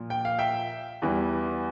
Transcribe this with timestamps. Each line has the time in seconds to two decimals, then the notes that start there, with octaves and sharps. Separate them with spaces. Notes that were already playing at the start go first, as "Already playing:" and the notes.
Already playing: A#2 F3
0.10 G5
0.25 F5
0.39 E5 G5
1.02 E2 E3 G3